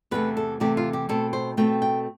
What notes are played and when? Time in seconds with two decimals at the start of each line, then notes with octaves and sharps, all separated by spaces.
0.11 E2 C3 E3 A3 B4
0.37 A4
0.60 E2 C3 E3 A3 G4
0.77 F4
0.93 G4
1.09 B2 A3 C4 A4
1.33 C5
1.57 B2 A3 C4 G5
1.82 G5